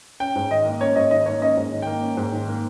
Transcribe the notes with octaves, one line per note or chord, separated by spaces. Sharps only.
C#4 G5
G#2
D#3 D#5
A#3
C#4 C#5
G#2 D#5
D#3 D#5
A#3 C#5
C#4 D#5
G#2
D#3
A#3 G5
C#4
G#2
D#3
A#3